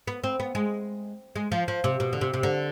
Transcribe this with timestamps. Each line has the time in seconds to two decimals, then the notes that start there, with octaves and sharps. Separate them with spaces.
0.07 B3
0.24 C4
0.40 B3
0.55 G#3
1.36 G#3
1.52 F3
1.68 F3
1.84 C3
2.00 B2
2.13 D3
2.21 C3
2.34 C3
2.43 D3